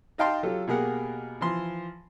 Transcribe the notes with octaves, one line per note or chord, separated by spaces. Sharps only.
D#4 D#5 F5 G5 A5 C6
F#3 F4 G4 A4
B2 A#3 G4 G#4 A#4 F#5
E3 F3 C6